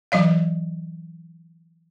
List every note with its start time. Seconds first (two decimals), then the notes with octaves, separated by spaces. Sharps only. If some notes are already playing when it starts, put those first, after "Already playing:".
0.12 E3 F#3 D5 F5